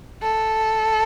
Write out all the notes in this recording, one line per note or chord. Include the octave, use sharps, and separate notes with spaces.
A4